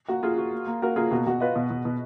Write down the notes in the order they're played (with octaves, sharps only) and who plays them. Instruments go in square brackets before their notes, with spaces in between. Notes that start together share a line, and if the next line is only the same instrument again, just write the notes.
[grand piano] A#3 [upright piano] F#4
[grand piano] A#3 [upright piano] F4 G#4
[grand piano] F#4
A#3
A#3
[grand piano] A#3 [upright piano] F#4 A#4
[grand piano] A#3 [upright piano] F4 G#4
[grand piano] B2 [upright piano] F#4
[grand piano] B2 [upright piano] F#4
[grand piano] F4 [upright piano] B4 D#5
[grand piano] B2
B2
B2